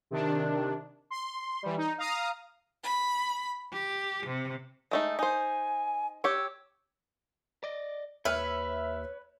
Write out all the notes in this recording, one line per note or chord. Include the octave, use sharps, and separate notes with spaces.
C3 D#3 D4
C6
E3 G3
D#4
F5 A#5 D#6 F6
B5
G4
C3
G#3 A3 D#4
D#4 C5 G#5
G4 C#5 E6
D5 D#5
D#2 B4 C#5 E5 F6